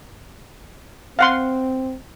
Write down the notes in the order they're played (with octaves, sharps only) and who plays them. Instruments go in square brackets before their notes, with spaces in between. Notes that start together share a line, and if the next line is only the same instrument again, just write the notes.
[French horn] C4 [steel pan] F5 F#5 C6